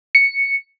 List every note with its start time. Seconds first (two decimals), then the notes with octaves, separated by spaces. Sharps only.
0.15 C#7